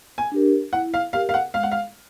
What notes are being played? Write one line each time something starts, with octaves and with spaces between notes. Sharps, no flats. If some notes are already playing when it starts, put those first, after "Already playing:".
G#5
D4 G4 A#4
E4 F#5
F5
G4 A#4 F5
F5
F#5
G#3 F5
F#5
F5